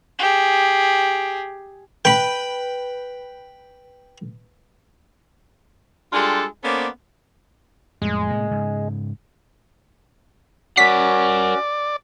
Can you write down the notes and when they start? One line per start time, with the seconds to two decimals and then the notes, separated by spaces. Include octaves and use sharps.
0.19 G4 G#4
2.05 B4 G5 B5
6.12 G3 G#3 D4 F4 G4 A4
6.63 A#3 B3 C#4 A4 C5 D5
8.02 F2 A2 G3 G#3
8.29 A2 C3 A#3
8.51 G#2 C#3
10.77 C#4 F#4 A#4 D5 F#5 B6